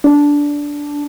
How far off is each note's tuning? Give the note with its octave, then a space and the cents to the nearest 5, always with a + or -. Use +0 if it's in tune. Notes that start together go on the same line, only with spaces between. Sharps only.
D4 -10